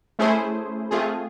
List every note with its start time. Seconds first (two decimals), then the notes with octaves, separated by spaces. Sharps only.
0.19 A3 C#4 E4 G#4 C5
0.91 A3 C4 F4 G#4